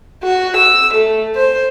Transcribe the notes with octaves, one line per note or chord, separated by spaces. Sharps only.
F#4
E6
A3
C5